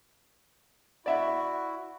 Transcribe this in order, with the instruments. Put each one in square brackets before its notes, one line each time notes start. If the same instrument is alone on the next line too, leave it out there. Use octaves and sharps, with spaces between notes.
[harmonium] E4 F#4 [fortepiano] D5 E5 F#5